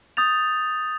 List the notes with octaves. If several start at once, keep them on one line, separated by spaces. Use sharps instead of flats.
D#6 G6 A6 F7